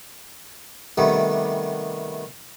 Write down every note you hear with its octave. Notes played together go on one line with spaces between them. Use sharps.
C3 D#3 G3 A3 B3